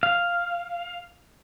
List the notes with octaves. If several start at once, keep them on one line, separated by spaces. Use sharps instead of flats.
F5